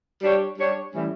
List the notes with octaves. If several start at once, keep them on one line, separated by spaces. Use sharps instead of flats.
G3 D4 G4 C#5
G3 D4 G4 C#5
A2 E3 G3 C#4